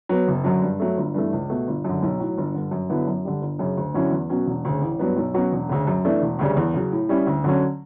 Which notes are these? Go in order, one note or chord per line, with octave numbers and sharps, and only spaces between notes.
F#3 B3
F#1
F#2 D3 F#3
G2
F#3 A3
G1
G2 E3 A3
C#2
B2 A3
G1
F#2 D3
B1
A2 F#3
G1
G2 D3
F#2
D3 F#3 B3 E4
F#2
D3 G3
G1
F#2 C#3
D2
D3 F#3 C#4 E4
E2
B2 F#3 C#4
E1
D2 C#3
A1
G2 F#3 B3
B1
B2 F#3 C#4 F#4
E1
D2 C#3
F#2
E3 A3 D4
E1
D2 C#3 G3
E2
C#3 F#3
A2
G3 C#4 E4
D2
D3 F#3 C#4